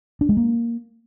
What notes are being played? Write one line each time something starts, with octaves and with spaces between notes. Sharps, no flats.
D4
G#3
A#3